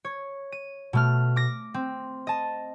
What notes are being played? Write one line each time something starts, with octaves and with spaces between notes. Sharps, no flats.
C#5
D#7
B2 A3 F6
D6 A#6
C4
D#5 A5